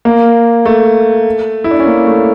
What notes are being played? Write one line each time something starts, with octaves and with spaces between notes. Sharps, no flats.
A#3
A3
E4
D4
C#4
A#3
A3